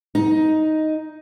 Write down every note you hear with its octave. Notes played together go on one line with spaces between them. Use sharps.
D#4